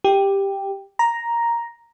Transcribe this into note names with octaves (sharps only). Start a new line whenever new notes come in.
G4
A#5